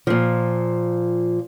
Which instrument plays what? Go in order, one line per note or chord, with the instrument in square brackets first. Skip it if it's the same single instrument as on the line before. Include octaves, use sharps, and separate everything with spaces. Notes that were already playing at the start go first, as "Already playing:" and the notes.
[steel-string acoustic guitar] A#2 F3